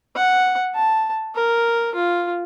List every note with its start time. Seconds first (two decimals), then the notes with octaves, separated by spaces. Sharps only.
0.16 F#5
0.75 A5
1.35 A#4
1.94 F4